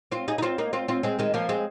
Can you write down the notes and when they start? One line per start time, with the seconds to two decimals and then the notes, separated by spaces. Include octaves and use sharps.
0.12 C4 F4
0.28 D#4 G#4
0.38 D#4
0.42 C4 F4
0.58 A#3 D#4
0.73 C4 F4
0.88 C4 F4
1.03 G#3 C4
1.19 D#3 G#3
1.34 F3 A#3
1.49 G#3 C4